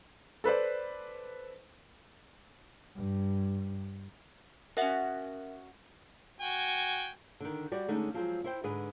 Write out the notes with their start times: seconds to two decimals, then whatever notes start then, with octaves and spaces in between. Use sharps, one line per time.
0.44 A4 B4 C5 D5
2.95 G2
4.77 C#4 F#4 A#4 E5 F#5
6.40 F#4 G5 G#5
7.41 D3 D#3
7.72 G3 F#4 D5
7.88 D3 G#3 A3 C#4 D#4
8.14 F3 F#3 G#3 C4
8.44 E4 C5 G5
8.64 G#2 D3 G#4 B4